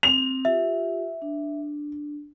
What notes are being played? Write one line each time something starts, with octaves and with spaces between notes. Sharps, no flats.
C4 F7
F4 G4 E5
D4